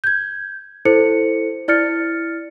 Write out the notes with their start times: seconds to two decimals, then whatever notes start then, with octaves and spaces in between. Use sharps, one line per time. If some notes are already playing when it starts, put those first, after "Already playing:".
0.04 G6 G#6
0.85 E4 A4 C5 C#7
1.68 E4 D5 F6 A6 C#7